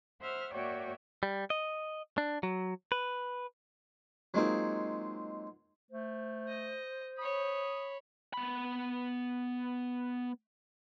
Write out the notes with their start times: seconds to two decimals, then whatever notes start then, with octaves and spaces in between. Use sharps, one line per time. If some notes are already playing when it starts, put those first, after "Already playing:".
0.20 C5 E5 F#5 F6
0.53 A#3 F#4 C#5 D5 E5 G5
1.23 G3
1.50 D#5
2.18 D4
2.43 F#3
2.92 B4
4.34 F#3 G#3 A#3 C4 D#4 F4
5.91 A3 C5
6.48 D#5
7.18 C#5 B5 D#6
8.34 B3 B5